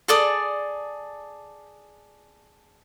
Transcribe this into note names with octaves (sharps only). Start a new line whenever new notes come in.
G#4 A4 D5 D#6